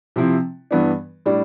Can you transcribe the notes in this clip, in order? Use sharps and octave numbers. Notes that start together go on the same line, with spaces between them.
C3 F3 C4 E4
G2 E3 B3 D4
A2 G3 D4